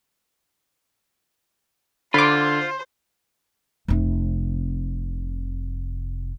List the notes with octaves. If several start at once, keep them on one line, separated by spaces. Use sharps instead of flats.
D3 F4 C5 B5 D6
F1 C3